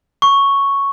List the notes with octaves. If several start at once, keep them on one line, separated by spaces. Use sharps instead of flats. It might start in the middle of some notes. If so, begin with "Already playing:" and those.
C#6